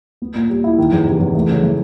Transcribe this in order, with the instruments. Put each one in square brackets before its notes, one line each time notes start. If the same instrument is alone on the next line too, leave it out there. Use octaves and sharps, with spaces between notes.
[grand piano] B3
A#2
G3
E4
D#3
E2
C3
E2
A3
C#3
E3